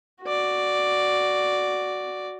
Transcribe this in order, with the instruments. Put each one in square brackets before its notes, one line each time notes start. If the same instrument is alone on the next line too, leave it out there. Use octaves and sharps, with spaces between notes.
[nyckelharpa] F#4 D5